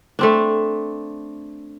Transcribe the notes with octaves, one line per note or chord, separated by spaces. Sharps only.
A3 C4 D4